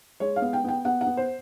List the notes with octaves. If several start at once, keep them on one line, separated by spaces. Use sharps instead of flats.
G#3 C#5
F5
B3
G5
B3 G5
B3 F#5
F#5
B3
C5